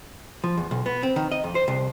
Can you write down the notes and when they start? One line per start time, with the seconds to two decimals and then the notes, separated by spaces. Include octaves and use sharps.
0.44 F3
0.58 E2
0.71 B1
0.86 B3
1.03 C4
1.16 D#3
1.32 D#5
1.44 F2
1.55 C5
1.68 C2